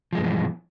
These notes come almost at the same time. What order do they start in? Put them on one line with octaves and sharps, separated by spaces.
F3 G#3 G2 B2 E3